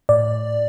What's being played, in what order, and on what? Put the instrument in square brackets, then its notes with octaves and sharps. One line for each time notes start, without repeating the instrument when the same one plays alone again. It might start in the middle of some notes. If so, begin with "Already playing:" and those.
[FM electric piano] A2 D5